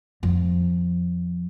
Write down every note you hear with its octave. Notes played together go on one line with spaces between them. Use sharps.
F2 F3